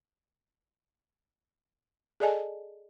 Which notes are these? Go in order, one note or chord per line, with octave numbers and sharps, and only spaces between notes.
G#4 A4 D5 D#5 G#5 A5